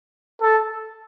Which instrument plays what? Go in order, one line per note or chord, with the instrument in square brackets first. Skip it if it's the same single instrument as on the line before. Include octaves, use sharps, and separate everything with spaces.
[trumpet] A4